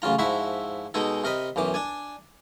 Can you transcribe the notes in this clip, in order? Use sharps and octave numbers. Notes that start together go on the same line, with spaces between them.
A1 C#3 F#3 F4 A#5
G#2 F3 E4 F#4 E5 B5
B2 G#3 D#4 G#4 A4
C3 A#4 D#5 B5
B1 F#2 E3 D6
D4 D5 G#5